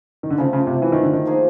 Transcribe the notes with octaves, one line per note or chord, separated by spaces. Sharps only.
D#3
D3
C#3 F3 A3 C4
C#3
C3
E3
D#3
D3
D#3
F3 A#3 D#4 G#4